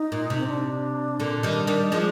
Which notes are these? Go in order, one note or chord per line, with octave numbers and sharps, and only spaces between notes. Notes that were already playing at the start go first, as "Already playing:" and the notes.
Already playing: D#4
A#2
C3
C4
D4
A#2 D3
D#3 G3
D#3 G3
F3 G#3